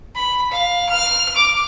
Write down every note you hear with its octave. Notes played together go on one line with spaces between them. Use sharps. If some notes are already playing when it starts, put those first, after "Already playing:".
B5
F5
F6
D6